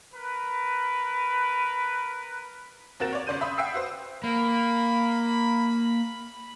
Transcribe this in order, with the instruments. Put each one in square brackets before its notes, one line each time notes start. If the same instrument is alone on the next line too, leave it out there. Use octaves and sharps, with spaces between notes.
[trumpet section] A#4 B4
[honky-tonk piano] D#2 C4 F#4 A#4 A6 E7
C#5 D5
G1 C#3 D5 C6 G6 D#7
E5 B5 C6 D#6
E5 F#5 G5 E6 C7
F#4 B4 C5
[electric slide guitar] A#3 [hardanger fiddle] B5